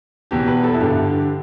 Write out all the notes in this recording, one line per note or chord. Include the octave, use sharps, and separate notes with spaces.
E2 B2 G4
B4
A4
E4
G2 D3 G4